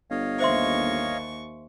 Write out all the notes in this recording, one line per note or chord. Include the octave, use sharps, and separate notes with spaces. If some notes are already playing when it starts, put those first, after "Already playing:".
G1 C#5 D#5 F5
D#2 C5 E5 C6 C#6